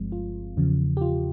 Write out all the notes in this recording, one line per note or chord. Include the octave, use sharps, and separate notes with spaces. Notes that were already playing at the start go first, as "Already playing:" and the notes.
Already playing: G1 G2 F3 G#3 C4
F4
E2 C#3 F3
G4
F4